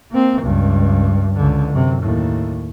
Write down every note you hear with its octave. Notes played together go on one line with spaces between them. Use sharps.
A#3 C4
C#2 G2
C#2 D3
F#2 C3
D#2 A2